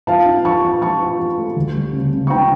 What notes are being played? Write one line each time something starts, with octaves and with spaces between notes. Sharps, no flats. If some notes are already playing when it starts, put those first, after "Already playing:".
F3 F5 A5
D4
F3 A5 C#6
F3
F3 A5 C#6
F3
F3
A3
D2
G3
C#3
C#3
C#6
D4 G5 A#5